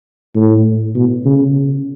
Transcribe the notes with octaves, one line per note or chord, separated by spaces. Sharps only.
A2
B2
C#3